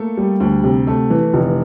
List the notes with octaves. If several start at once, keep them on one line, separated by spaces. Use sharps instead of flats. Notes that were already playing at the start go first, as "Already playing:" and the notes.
Already playing: A3 A#3 A4
G3
D2
C3
A3
E3
F1